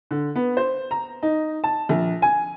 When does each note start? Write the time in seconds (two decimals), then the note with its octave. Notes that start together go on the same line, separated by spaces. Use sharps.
0.11 D3
0.36 B3
0.57 C5
0.91 A#5
1.23 D#4
1.64 A5
1.89 A#1
2.22 G#5